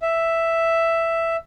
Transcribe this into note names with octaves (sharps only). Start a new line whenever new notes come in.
E5